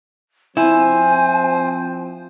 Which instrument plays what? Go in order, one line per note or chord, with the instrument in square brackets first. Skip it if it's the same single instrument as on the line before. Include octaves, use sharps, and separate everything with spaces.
[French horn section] F3 C4 [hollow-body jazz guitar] E4 [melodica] C5 [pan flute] G#5